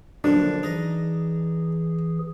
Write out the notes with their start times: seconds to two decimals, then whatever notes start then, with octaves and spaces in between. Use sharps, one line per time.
0.24 F#2 D3 F3 D4
0.63 E3 D#4 G#4 D#5